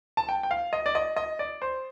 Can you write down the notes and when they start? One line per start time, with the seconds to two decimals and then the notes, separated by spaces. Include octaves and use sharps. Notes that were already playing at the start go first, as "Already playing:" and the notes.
0.17 A5
0.29 G5
0.43 G5
0.51 F5
0.73 D#5
0.86 D5
0.95 D#5
1.16 D#5
1.39 D5
1.62 C5